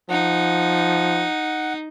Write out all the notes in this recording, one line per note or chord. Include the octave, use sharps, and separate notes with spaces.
F3 D#4 F#5